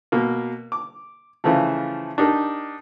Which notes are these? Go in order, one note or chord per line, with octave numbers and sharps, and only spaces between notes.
B2 A#3
D6
C#3 E3 F3 A3
D4 D#4 G4 A#4